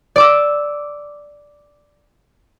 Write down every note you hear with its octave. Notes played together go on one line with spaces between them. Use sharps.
D5 D6 E6